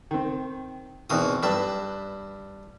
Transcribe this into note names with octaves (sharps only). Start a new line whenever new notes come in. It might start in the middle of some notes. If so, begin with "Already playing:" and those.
D#3 C4
E2 B2 D#3 E3 C4 D#6
G2 B4 E5 G5 A5